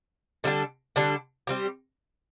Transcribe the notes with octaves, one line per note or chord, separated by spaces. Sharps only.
D3 G3 D4 A4
D3 G3 D4 A4
G3 C4 G4